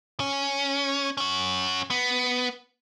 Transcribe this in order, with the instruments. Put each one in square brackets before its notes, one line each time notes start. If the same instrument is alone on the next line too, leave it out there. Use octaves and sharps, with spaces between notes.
[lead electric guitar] C#4
C#4 F#4
B3